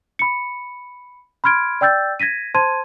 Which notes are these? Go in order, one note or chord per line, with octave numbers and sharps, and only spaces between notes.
B5 C#7
B5 C6 F6 G#6 D7
D5 G5 E6 G6 A6
G#6 A#6 B6 D#7
C5 A5 C6 G#6 D#7